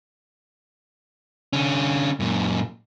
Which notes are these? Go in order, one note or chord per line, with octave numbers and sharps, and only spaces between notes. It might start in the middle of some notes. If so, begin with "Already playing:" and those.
D3 C#4
F#2 A#2